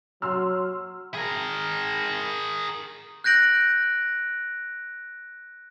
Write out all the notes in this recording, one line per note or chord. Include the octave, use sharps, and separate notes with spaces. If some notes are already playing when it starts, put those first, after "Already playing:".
F#3 C6 E6 F6
G#4 A#4
F#6 G6 A#6 D7 F#7